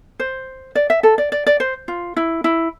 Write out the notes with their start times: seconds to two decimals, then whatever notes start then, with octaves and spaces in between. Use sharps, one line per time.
0.20 C5
0.75 D5
0.90 E5
1.03 A4
1.18 D5
1.32 D5
1.46 D5
1.60 C5
1.88 F4
2.17 E4
2.44 E4